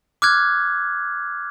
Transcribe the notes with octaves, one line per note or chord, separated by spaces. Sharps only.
D6 F6 F#6 G#6